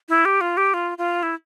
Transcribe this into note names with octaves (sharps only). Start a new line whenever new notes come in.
E4
G4
F4
G4
F4
F4
E4